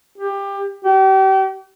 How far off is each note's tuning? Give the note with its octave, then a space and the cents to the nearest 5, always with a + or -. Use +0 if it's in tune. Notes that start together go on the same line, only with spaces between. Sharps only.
G4 +20
G4 -35